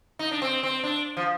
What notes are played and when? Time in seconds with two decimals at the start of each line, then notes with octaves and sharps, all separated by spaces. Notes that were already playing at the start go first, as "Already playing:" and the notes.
0.19 D#4
0.31 D4
0.42 C4
0.63 C4
0.84 D4
1.17 F3